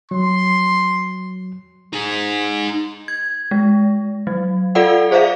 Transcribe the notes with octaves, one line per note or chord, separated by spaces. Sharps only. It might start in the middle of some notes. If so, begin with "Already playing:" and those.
F#3 C6
D#4 G#4
G#6
G#3
F#3
F4 A4 D5 F5 F#5
G#4 C5 D5 E5 F5